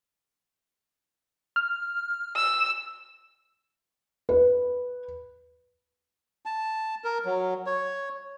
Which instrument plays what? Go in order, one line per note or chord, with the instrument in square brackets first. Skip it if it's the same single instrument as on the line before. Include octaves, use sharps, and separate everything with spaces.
[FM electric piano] F6
[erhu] E6
[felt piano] B4
[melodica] A5
A#4
F#3
C#5